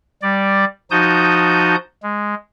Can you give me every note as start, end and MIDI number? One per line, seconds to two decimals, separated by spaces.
0.22 0.65 55
0.22 0.65 74
0.91 1.75 53
0.91 1.75 63
0.91 1.75 66
0.91 1.75 81
0.91 1.75 87
0.91 1.75 91
2.03 2.35 56